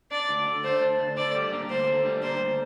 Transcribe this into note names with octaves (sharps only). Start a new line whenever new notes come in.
D4 D5
D2
D3
A3 C5
D4
D2
D3 D5
G3
A#3
D2 C5
D3
G3
A#3 C5
D2